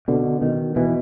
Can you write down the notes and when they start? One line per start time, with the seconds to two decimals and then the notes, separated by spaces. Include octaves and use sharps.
0.08 B2 D3
0.42 B2 D#3
0.76 B2 E3